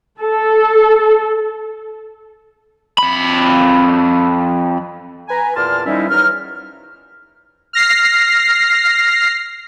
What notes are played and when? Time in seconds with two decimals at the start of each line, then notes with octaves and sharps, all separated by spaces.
0.21 A4
2.99 F2 B5
5.29 B4 G#5 A#5
5.56 E2 A#2 D5 A5 C6 F6
5.86 D#3 F3 G3 C#4 D#4 E4
6.10 E2 F#3 D#4 A#4 F6
7.73 F6 A#6 C7